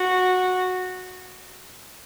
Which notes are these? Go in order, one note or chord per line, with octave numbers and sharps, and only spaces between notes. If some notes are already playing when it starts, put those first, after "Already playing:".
Already playing: F#4